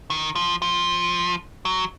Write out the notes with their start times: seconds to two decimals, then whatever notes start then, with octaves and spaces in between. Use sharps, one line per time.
0.10 D#3
0.35 F3
0.62 F3
1.65 F#3